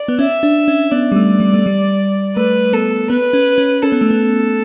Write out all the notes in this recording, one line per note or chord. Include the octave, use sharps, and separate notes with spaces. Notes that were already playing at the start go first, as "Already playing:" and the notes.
Already playing: D5
B3
C#4 E5
D4
C#4
B3 D5
G3
A3
G3
A3
G3
A3 B4
B3 A4
B3 B4
C#4
C#4
C#4 A4
B3
A3
B3